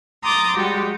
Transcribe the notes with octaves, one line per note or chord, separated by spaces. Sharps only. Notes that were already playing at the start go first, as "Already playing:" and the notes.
A#5 C6 D6 D#6 G6 A6
G3 G#3 F#4 G4